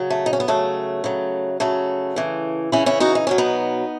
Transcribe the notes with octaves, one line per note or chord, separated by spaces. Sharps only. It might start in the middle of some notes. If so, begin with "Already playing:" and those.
Already playing: C#3 F#3
A3
D#4
C#4
B3
C#3 F#3 A3
C#3 F#3
C#3 F#3 A3
C#3 E3
C#3 E3 C#4 E4
C#4 E4
D#4 F#4
D#4
B2 F#3 C#4
B3 D#4